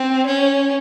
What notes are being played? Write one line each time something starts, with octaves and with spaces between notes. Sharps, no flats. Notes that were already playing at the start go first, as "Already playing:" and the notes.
Already playing: C4
C#4